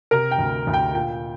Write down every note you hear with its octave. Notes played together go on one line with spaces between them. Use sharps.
C3 A#4
G5
D2
D2
G5
A#2 G5